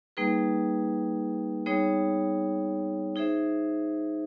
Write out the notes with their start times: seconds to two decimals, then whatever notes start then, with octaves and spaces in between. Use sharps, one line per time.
0.17 G3 A#3 D#4 G#4 B4
1.66 G3 B3 D#4 G#4 C#5
3.16 D#4 G#4 C5 E5